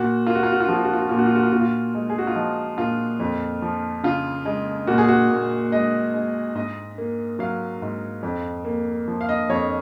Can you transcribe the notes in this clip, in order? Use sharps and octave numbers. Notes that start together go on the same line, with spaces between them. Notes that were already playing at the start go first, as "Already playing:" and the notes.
Already playing: A#2 F#4
A#3 F4
F#4
F4
F#4
F4
F3 F#4
F4
F#4
F4
F#4
A#2 F4
F#4
F4
F#4
F4
A#2 F#4
F4
G#3
G#4
F#4
F4
F3 D#4
A#2 F4
F2
F3
C#3 F4
G#3
A#2 F#4
G#4
F#4
A#2
G#3 D#5
G#3
G#2 D#5
A#3
F#3 F5
G#2
F2
A#3
F3
F5
D#5
F2 C#5